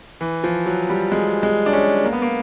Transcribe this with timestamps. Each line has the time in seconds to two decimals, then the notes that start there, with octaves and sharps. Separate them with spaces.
0.21 E3
0.44 F3
0.66 F#3
0.90 G3
1.12 G#3
1.43 G#3
1.66 D4
1.73 C#4
2.04 A#3
2.13 B3
2.22 A#3